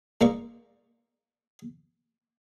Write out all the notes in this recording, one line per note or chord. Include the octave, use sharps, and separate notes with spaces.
G#2 A#3 D5 C#6